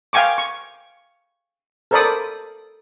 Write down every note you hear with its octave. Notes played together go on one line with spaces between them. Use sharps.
F5 G5 G#5 C#6 D6
C#6
A4 A#4 C5 D5 B5 D#6